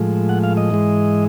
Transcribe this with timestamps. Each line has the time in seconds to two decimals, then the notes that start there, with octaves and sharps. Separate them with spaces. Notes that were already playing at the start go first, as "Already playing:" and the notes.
Already playing: A2 F3 G#3
0.29 F#5
0.43 F5
0.57 D#5
0.70 G#2 E3 G#3